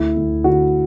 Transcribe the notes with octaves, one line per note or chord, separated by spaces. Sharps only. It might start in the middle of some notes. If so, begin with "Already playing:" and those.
Already playing: D2 E4
D2
D3 F#4